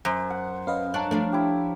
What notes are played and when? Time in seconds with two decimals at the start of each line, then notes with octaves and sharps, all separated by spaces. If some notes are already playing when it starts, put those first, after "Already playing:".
0.05 F#2 C5
0.30 F#5
0.67 C#4 B4 D#5 F5
0.94 D4 C#5 A5 A#5 F#6
1.11 F3 A3 D4 F5
1.32 E4 G4